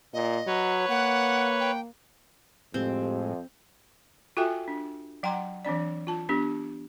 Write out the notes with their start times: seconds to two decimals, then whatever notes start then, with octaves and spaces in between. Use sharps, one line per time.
0.13 A#2 D#5
0.47 F#3 B4 C#5
0.89 A#3 F#5
1.60 G5
2.74 F2 A2 G#3 C4 G4
4.37 F4 F#4 A4 E5 G5 G#5
4.68 D4
5.23 F#3 F#5 G5 A#5 C6
5.65 E3 C4 D4 D5
6.07 F4 A5
6.29 B3 D4 G4